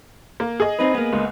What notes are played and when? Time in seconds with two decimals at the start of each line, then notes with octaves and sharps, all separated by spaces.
0.40 A#3
0.60 G#4 D#5
0.79 C4 D#4 B4
0.95 A#3 B3
1.13 C#2 G#3